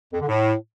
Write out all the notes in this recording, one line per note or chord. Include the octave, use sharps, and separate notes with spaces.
F2
D3
A2